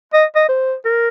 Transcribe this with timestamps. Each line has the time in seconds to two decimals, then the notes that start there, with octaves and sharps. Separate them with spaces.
0.13 D#5
0.36 D#5
0.49 C5
0.85 A#4